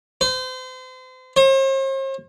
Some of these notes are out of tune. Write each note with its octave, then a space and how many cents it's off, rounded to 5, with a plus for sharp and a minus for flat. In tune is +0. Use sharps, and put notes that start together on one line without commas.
C5 -35
C5 +45